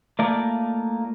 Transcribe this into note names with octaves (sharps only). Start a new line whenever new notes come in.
A3 A#3 D#4 F4 D5